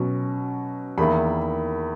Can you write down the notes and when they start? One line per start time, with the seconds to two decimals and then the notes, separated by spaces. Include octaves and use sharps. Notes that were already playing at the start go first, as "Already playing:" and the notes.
Already playing: B2 F#3 C#4
0.98 E2 D#3 A#3 E4 B5